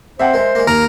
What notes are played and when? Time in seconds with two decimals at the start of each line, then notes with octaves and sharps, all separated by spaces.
0.20 C3 C5 E5 F#5 G5
0.34 G#3 A#4 E5
0.55 G#3 A#3
0.67 D#2 A#4 A#5 F7